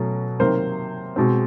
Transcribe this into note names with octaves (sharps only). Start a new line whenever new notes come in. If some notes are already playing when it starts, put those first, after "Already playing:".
Already playing: B2 F#3 A3 C#4
C3 D#3 F#3 A#3 A#4 C5
B2 G#3 C4